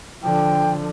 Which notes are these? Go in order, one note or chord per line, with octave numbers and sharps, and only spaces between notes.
D3 F3 G5